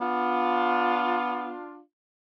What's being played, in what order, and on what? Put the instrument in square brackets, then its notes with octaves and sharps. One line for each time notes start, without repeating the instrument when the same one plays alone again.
[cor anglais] B3 [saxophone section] D4 F4